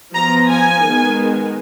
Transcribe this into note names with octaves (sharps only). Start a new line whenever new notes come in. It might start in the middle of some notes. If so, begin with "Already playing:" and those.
F3 B3 A#5
G#5
D#3 G#3 B3